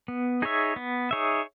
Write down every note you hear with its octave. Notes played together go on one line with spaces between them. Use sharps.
B3
D#4 G#4 C#5 E5
B3
D#4 G#4 C#5 E5